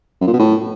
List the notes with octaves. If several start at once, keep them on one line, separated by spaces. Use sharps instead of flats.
F#2
A#2
B2
A2